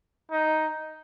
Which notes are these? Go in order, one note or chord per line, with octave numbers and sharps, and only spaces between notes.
D#4